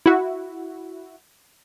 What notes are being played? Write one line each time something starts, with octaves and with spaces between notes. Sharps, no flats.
E4 F#4